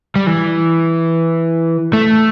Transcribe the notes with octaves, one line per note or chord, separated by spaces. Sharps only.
G3
E3
A3